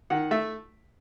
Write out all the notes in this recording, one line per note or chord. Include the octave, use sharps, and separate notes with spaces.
D#3 F#5
A3 E5